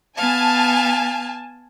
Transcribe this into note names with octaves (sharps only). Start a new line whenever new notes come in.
B3 F5 G#5 A5